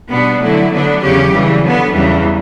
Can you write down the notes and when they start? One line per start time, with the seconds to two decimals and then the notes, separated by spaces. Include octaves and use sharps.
0.10 B2 G3 B3 D4
0.40 D3 F#3 A3 E4
0.71 D3 F#3 B3 D4
1.01 E2 C#3 F#3 C#4 G4
1.31 F#2 C#3 E3 G3
1.62 D3 F#3 B3
1.93 E2 C#3 E3 G3